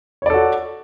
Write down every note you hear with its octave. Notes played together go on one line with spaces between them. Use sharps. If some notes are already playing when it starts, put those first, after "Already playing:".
F#4 A4 C#5 D5